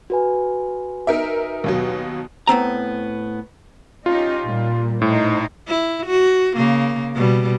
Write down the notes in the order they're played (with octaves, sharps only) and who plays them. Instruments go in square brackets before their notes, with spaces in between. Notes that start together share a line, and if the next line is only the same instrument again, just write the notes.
[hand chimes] F#4 B4 G#5
[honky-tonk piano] D#4 A#4 E5
D#2 B2 F#3
[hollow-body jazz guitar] A2 B3 C4 A#5
[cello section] C#4 D#4 G4 [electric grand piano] F4
[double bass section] A#2 [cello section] G3 A#3
[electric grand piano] A2 [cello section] D#4 C5
[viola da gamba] E4
F#4
C#3 A#3
B2 G3